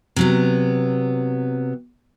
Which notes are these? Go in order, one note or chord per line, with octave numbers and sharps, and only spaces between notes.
C3 F#3 B3